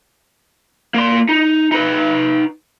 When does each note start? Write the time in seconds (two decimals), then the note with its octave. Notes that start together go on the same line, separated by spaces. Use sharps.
0.94 A#3 C6
1.29 D#4
1.72 D#4 B4